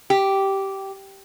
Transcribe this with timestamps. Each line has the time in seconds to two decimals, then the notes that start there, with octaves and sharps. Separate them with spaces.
0.10 G4